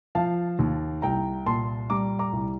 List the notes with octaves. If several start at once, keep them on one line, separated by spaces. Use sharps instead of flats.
F3 F5 A5
D#2
C2 G5 A#5
A#2 A5 C6
G3 A#5 D6
A#5 D6
C2